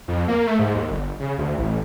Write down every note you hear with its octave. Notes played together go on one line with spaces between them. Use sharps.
F2
A#3
A3
G#2
D#2
G1
C#3
D2
A1